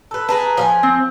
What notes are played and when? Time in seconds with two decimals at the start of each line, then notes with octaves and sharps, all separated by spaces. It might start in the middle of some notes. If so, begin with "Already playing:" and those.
0.11 A4 B4
0.29 G#4 A#4 B4 A5
0.57 F3 E5 G#5
0.83 C4